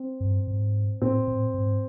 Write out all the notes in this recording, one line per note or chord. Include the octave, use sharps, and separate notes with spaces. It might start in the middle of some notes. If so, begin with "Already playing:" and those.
Already playing: C4
G2
G#2
A2 C4
A2
G#2